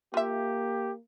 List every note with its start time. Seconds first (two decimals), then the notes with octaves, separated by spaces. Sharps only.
0.14 A#3 F4 G4 E5